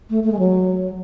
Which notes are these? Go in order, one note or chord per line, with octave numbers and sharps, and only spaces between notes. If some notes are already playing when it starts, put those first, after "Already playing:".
A3
A3
G#3
F#3